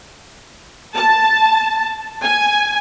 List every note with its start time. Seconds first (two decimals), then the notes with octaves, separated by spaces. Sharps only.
0.95 A5
2.23 G#5